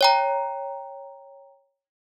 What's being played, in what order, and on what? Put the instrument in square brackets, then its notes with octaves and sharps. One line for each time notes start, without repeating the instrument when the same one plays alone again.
[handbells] C#5 G5 A#5